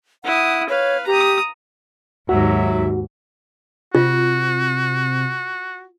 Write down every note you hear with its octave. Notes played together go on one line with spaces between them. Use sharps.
E4 F#5 D#6
B4 C#5 F5
G4 A#5 D#6
D#2 G#2 F#3 F#4 E5
C3 F4 F#4